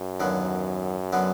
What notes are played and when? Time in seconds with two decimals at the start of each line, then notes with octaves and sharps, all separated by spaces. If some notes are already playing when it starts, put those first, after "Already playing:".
Already playing: F#2
0.20 D#2 D3 F#3 B3
1.13 D3 F#3 B3